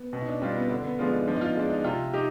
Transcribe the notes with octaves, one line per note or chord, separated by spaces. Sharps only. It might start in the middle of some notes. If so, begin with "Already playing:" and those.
Already playing: B3
B2 C4
D#4
D4
G3 C4 D4 F4
B3
D3 D4
B3
F3 G#3 B3 D4 F4
D#4
F3 D4
D#4
F4
G#3 D4 D#4
D#4
C3 F4
D#4 G4